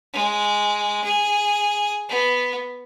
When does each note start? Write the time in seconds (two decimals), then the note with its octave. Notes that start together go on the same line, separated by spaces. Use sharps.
0.14 G#3
1.05 G#4
2.09 B3